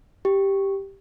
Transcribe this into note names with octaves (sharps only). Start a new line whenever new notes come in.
G4